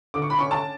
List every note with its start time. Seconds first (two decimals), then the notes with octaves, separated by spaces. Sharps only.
0.14 D3 D6
0.22 C#6
0.30 B5
0.39 C#4 C#6
0.51 A5